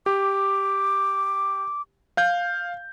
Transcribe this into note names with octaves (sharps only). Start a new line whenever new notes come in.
G4 D6
F5 G6